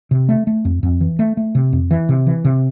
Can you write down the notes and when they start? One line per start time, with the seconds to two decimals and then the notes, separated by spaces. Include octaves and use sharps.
0.11 C3
0.29 A3
0.47 A3
0.65 F2
0.83 F2
1.01 E3
1.19 A3
1.37 A3
1.55 C3
1.73 F2
1.91 E3
2.09 C3
2.26 E3
2.45 C3